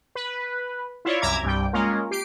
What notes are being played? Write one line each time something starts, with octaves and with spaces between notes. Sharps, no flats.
B4
E4 F4 C#5 D5
C2 F#2 E5 A#5 D6 G#6
C2 G2 G3 G5
G#3 A#3 C#4 F4 A#4
G4 C7 D7